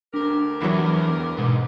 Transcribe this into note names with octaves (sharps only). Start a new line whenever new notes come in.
D2 D4 G4 A#4
E2 E3 F#3
G#2 B2